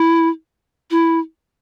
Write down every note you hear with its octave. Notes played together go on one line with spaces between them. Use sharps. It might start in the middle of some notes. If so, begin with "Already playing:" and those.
Already playing: E4
E4